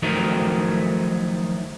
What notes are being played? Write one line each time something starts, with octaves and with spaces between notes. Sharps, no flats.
D#3 F3 F#3 A3 D#4